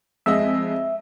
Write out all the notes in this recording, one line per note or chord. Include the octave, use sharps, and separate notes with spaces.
F2 G#3 D#5 E5